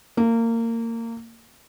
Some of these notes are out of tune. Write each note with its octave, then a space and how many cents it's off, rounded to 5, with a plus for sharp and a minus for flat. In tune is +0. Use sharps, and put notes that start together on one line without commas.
A#3 -25